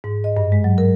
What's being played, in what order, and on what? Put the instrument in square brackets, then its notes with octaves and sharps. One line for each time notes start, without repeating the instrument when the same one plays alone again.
[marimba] G#2
D#5
G2
G#3
F#3
A#4